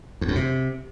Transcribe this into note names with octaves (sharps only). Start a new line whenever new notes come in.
E2
F#2
C3